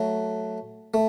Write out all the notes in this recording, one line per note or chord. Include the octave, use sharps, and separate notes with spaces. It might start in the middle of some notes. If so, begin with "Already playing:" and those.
Already playing: F#3 A3
A3